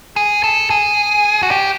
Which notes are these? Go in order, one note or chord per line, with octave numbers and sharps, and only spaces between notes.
G#4
A4
G#4
F#4
G4